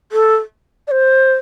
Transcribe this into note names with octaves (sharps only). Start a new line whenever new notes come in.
A4
D5
C5